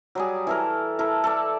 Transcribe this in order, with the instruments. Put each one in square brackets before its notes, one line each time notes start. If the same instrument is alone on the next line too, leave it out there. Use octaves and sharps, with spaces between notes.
[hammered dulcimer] F#3 G3 G#4
E3 A4 A#4
E4 A4 A#4
A4 D5